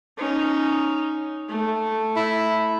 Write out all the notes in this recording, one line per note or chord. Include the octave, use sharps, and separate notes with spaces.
C#4 D#4
A3
E4